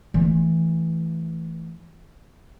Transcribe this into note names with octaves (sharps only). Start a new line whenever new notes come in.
E3 A3